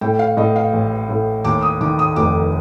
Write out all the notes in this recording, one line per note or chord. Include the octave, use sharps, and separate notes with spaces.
A2 G5
F5
A2 D#5
F5
A1
A2
D#2 D6
D#6
D#3 D6
D#6
F1 D6